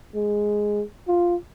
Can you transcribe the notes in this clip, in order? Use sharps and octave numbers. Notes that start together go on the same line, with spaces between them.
G#3
F4